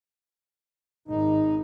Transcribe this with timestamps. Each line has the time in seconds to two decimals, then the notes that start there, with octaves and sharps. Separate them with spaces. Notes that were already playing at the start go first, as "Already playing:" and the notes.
1.08 G#1 D#4